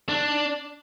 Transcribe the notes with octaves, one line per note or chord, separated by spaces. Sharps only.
D4